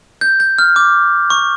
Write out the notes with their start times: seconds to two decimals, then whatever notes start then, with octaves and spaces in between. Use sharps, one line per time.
0.21 G6
0.40 G6
0.59 F6
0.76 D6
1.30 C#6